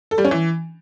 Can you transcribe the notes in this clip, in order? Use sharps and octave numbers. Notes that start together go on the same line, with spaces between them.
A4
G3
C#4
E3